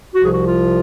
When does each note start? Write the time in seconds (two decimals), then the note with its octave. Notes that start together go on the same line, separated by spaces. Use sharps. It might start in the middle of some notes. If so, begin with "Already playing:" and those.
0.15 C2 C3 F3 F#4
0.24 G#4
0.34 F#4
0.44 F4